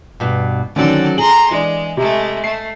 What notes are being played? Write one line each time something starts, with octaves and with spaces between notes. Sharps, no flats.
G2 B2
D3 D#3 F#3 C4 C#4 A4 D5
G#4 A#5 C6 F#7
E3 G#3 D4
C3 G#3 A3
A3 C7